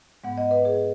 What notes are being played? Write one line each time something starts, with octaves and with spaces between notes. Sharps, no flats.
G#2 G#3 B3 F#5
D#5
B4
G#4